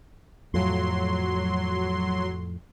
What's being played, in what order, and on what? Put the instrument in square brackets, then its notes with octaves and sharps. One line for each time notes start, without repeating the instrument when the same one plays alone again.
[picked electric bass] F2 A2 [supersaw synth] F#3 C6